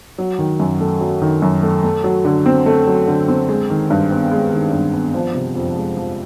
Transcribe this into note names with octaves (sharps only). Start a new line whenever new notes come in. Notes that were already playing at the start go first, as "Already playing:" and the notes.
F#3
D#3
F#2
A3
F#3
D#3
F#2
A3
A3
F#3
D3
C4
A3
F#3
D3
C4
G#3
D#3
G2
B3
G#3
D#3
G2
B3
F3
C3
F2
G#3
F3